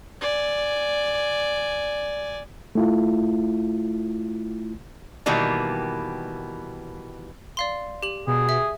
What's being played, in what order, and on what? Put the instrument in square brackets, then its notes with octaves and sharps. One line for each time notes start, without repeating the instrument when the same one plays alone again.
[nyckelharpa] D5 G#5
[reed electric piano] A3 E4 F4
[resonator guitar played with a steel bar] B2 D#3 E3 G3 A#3
[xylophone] D5 F5 C6
G4 F#7
[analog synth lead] B2 [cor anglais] G#4
[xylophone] E5